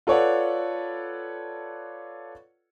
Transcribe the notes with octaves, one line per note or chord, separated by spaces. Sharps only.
F4 A4 B4 C#5 D5 F#5